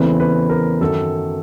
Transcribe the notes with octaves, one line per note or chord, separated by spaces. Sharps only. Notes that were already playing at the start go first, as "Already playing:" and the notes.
Already playing: E2 C#3 E3 A3 C4 B4
B4
A#4
F#2 D#3 F#3 A4